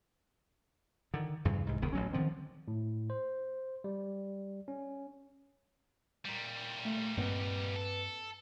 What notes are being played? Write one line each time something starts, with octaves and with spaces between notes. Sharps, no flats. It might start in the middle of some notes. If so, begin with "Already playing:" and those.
D3 D#3
E2 G2 C#3
C2 G#2
E1 C#2 D#3 B3
A1 F#3 C#4
D3 D#3 F3 C4
A2
C5
G3
C#4
A#2 G3
A3
G2 A#3 C4 B4 D#5 F#5
A4